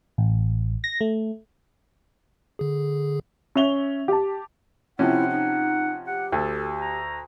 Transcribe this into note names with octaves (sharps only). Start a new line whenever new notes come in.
A1
A#6
A3
D3 G#4
C#4 E5 F7 G7
G4 A5
C3 F3 C#4 E4 F#5
D#4
G4 F#5
D2 A4
A#5